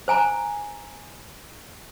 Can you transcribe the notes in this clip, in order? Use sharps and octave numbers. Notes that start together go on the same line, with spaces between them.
C5 G#5 A#5